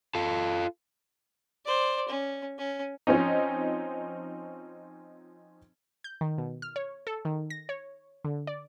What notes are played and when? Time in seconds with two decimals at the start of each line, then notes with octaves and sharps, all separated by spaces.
0.15 F4 A4
1.65 C5 D5
2.09 C#4
2.58 C#4
3.07 F3 C4 C#4 D#4
6.04 G6
6.21 D#3
6.38 B2
6.62 F6
6.76 C#5
7.07 A4
7.25 D#3
7.50 A#6
7.69 C#5
8.25 D3
8.47 D5